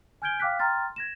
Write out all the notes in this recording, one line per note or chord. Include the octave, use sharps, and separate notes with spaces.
G#5 F6 G6 G#6 D7 G7
F5 G5 D6 F6 F#6 B6
G5 A#5 C6 F6 A6
G#6 A#6 E7